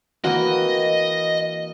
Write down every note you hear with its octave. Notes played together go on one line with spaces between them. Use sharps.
E3 A#3 C4 F#4 D#5